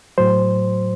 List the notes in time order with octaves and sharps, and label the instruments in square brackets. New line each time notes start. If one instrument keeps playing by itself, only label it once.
[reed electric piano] A2 F#3 C5